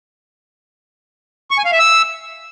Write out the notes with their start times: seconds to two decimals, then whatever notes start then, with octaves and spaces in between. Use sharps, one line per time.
1.51 C#6
1.58 G#5
1.65 F5
1.72 E5
1.79 E6